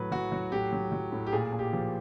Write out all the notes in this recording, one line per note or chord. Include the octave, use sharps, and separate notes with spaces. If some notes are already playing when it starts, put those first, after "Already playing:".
Already playing: A2 F#3 B4
F#3 F#4
F#3
A2 G4
F#3
F#3
A2
G4
A#2 G#4
A#2
G4
F3